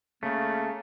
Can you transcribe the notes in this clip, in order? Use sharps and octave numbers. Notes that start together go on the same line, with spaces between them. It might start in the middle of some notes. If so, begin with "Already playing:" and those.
C#3 A3 A#3